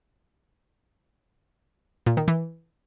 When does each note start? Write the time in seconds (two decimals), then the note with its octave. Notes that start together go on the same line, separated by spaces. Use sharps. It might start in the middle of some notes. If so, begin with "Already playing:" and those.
2.07 A#2
2.17 D#3
2.28 E3